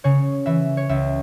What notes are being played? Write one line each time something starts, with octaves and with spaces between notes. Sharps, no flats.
C#3 C#5
E3 E5
C#5
C#2 E5